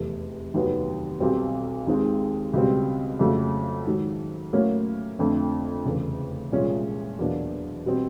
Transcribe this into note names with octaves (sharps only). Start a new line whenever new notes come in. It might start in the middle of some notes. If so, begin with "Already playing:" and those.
Already playing: F1 E2 C3
F1 D#2 D#3 F#3 B3
B1 B2 G3 C4
D#2 D#3 G#3 C4
C#2 B2 G3 C4
F2 C#3 F#3 A3
G#2 D#3 F#3
A2 F#3 A#3 C#4
F2 D3 F3 A3 C4
F1 E2 C#3
C2 A#2 F3 G#3 C#4
E2 B2 F#3 A#3 D4
B2 G3 C4